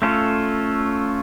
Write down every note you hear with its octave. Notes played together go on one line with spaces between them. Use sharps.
A3 C#4 F4 A4